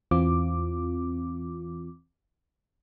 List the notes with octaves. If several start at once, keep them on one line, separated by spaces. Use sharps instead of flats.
E2 E3 C4 F4 D6